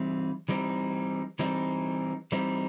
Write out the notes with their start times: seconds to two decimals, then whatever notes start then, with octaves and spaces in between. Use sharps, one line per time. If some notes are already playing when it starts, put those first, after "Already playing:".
Already playing: E3 G3 C4 D#4
0.49 E3 G3 C4 D#4
1.39 E3 G3 C4 D#4
2.32 E3 G3 C4 D#4